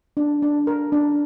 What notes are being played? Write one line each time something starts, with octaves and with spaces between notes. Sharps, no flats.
D4
D4
A#4
D4